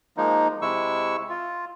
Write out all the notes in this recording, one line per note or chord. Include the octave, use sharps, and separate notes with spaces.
F3 G#3 A#3 D#4
C3 G#3 E4 C#6 E6
F4